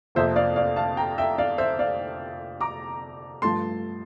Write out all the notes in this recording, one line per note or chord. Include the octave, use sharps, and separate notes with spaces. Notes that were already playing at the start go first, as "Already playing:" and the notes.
F2 C3 F3 A#3 C5 E5
D5 F5
D5 F5
F5 A5
G5 A#5
E5 G5
D5 F5
C5 E5
D5 F5
A#5 D6
G2 F3 A3 A5 C6